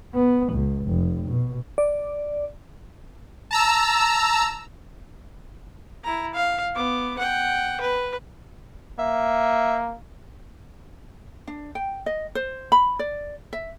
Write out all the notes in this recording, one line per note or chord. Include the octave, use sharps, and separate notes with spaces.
B3
C#2
F1
B2
D5
A5 A#5 E6
E4 A#5
F5
B3 D6
F#5 G5
B4
A#3 E5
D4
G5
D#5
C5
B5
D5
E5